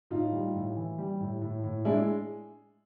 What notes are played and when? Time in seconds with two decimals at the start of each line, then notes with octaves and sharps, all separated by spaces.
0.10 A2 D#4 F4
0.32 G3
0.55 A2
0.76 E3
0.98 G3
1.20 A2
1.42 A2
1.64 A2
1.85 G#3 D4 E4